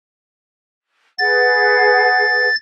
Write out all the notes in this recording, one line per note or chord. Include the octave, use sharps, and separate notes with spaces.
G#4 B4 F#5 A6